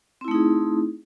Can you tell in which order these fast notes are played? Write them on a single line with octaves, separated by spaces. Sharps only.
C4 E4 A3 D#4 G#4